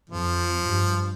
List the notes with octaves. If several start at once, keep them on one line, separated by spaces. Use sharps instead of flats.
F2 F3
G2